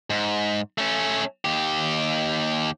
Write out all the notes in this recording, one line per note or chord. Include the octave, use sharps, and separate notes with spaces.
G#2
A3 C#4
D#2 G4